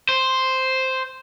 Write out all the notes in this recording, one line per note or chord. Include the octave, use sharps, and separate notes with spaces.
C5